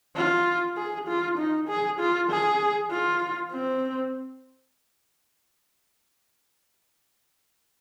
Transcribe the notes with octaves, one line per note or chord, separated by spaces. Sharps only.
F4
G#4
F4
D#4
G#4
F4
G#4
F4
C4